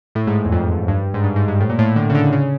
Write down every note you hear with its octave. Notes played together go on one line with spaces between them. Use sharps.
A2
G#2
E2
F2
G2
G#2
G2
G#2
G2
A2
A#2
A2
D3
C#3
D3
C#3